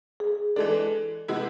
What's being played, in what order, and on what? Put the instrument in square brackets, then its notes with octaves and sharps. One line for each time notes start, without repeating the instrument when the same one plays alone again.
[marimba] G#4
[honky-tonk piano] E3 G#3 D4 [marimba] A4
[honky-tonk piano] C3 G#3 B3 E4